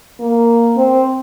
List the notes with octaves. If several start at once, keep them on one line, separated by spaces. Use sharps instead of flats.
A#3
C4